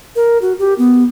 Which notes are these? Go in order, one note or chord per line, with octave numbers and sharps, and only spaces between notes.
A#4
F#4
G4
B3